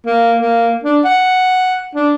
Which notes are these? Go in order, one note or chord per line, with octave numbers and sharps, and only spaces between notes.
A#3
A#3
D4
F#5
D4